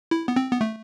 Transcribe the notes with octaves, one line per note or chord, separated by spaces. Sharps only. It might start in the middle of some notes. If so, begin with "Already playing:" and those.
E4
B3
C4
B3
A3